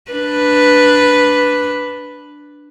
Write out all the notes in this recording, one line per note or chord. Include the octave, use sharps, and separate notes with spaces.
D4 B4